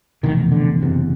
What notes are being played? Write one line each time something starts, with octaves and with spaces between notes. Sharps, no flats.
F1 E2 B2 D#3
D3
F#1 E2 C3